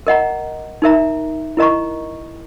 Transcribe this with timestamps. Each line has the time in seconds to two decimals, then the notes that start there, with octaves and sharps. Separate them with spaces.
0.07 A#4 D#5 F#5 A#5
0.82 D#4 A#4 E5 A#5
1.57 E4 A#4 D#5 A#5 C#6